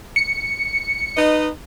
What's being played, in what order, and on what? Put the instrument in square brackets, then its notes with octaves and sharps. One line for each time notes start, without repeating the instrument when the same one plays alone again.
[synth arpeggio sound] C#7
[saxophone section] D#4 B4 D#5